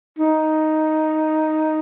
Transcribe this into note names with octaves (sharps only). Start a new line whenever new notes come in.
D#4